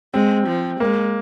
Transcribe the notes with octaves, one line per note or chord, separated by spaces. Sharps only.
G#3 C4
F3
G#3 A#3